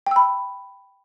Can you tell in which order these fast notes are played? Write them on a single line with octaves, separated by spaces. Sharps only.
G5 E6 B5